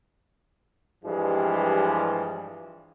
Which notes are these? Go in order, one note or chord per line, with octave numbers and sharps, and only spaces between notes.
G2 E3 F3 G3 G#3